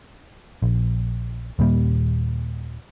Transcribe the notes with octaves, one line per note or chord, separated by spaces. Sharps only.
A#1
D#2 A#2 G3 A#3